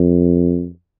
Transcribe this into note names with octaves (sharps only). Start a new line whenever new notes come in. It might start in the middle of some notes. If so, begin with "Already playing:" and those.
Already playing: F2